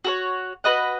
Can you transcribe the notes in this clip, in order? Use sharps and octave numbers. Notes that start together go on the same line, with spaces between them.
F#4 A4 C#5
F#4 B4 D#5 F#5